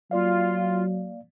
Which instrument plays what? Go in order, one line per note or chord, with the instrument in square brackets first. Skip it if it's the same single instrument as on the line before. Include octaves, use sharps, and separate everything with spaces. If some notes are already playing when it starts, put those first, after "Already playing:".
[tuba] F#3 [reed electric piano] A#3 D5 F5 [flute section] F4